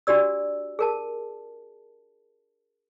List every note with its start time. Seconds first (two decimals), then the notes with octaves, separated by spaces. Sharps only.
0.07 D4 F#4 G4 D5 E6
0.79 G#4 A#4 A5